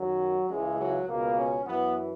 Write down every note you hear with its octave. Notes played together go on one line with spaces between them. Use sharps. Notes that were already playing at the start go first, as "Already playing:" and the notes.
Already playing: F#2 D#3 F#3
C#2 C#3 E3 G#3
F#3
C#2 B2 A#3
C#4
F#2 E3 B3